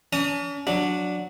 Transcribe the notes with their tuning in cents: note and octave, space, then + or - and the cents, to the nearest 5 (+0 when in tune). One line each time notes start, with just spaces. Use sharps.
C#4 +45 A5 +45 D#6 +0
F#3 -15 D4 +0